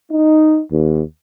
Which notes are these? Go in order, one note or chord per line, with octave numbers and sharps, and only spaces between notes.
D#4
D#2